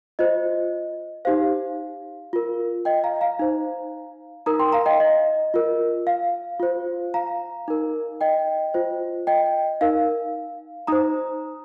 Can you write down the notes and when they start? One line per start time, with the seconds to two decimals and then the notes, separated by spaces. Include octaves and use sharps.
0.19 F4 C5 D#5
1.25 D#4 G4 C5 F5
2.33 F4 A#4
2.85 D#5 G5
3.04 F5 A#5
3.21 F5 A#5
3.39 D#4 C5
4.46 D#4 A#4 A#5 D#6
4.59 G5 C6
4.72 F5 A#5
4.86 D#5 G5
5.00 D#5
5.54 F4 A#4
6.07 F5
6.60 F4 C5
7.14 F5 A#5
7.68 D#4 A#4
8.21 D#5 G5
8.74 F4 C5
9.27 D#5 G5
9.81 D#4 A#4 F5
10.87 D#4 C5 A#5 D#6